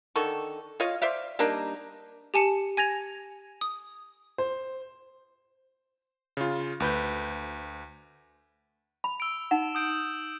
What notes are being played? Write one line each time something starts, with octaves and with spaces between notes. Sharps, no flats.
D3 D#3 A4 C#6
F4 C#5 D#5 F5
C5 D5 E5 F5
G3 A#3 D4 D#4
G4 G#5 A5 C#7
G#5 G#6 A#6 F7
D#6
C5
C#3 F4
D2 B4 G6
B5 F7
E6 D7
D#4 F#5 E7
D#6 G6 D7